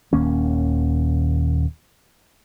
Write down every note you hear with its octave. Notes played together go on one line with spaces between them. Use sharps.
D#1 D#2 A#3 C#4